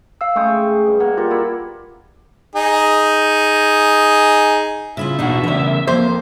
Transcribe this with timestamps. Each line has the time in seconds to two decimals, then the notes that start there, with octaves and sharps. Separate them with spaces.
0.21 F5 E6
0.36 C#3 G#3 A3 G5 C#6 D#6
0.87 G2
1.00 A#3 F#5
1.17 F4 G4 A#4
1.30 E4 D5 E5
2.56 D#4 G#4
4.97 C#3 E4 F4 E5
5.19 E2 B2 D4 D#4 F#4
5.44 E2 C#3 A#4 D5
5.87 F2 A#3 C5